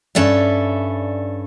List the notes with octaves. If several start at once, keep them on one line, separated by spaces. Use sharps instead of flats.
G2 C#4 A4 D5 E5